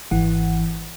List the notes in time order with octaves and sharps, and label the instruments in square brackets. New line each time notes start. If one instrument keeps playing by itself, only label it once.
[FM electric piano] G#1 E3 F#5